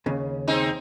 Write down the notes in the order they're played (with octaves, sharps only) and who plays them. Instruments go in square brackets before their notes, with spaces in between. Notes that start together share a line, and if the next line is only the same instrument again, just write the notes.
[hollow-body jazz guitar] D#2 C#3
[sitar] G#3 C4 D#4